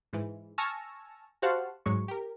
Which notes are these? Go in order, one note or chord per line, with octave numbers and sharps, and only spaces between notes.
G#2 E3
G#5 A5 C#6 E6 F6 A#6
F#4 G4 C5 F5 F#5 A5
G#2 F#3 G#3 C#6
G4 A#4